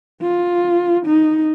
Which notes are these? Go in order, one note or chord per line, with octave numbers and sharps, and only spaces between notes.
F4
D#4